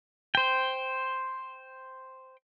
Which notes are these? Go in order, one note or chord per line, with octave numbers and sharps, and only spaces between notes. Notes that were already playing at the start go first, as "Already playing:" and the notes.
C5 G5